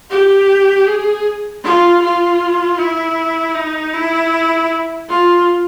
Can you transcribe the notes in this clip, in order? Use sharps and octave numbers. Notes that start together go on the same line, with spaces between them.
G4
G#4
F4
F4
E4
D#4
E4
F4